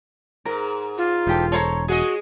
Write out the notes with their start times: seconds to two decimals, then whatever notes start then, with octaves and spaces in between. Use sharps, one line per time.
0.45 G#2 A#4
0.98 F4
1.27 E1 D#4 G4 A4
1.52 A4 C5 C#5 A#5
1.88 G#3 F#4 G#4 D#5